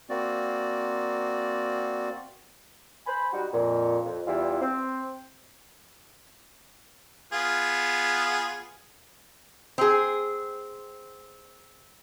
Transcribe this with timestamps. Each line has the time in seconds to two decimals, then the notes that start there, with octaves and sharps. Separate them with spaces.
0.10 A#3 C4 F#4 D5
3.07 C5 G#5 B5
3.33 G3 D#4 F#4
3.53 F2 A#2
4.05 F2
4.27 E2 E3 G3 E4 F4
4.61 C4
7.33 B3 F4 G#4
9.78 C4 G#4